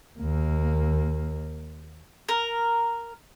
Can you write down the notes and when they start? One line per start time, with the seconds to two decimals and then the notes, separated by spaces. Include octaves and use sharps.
0.19 D#2 A#3
2.29 A#4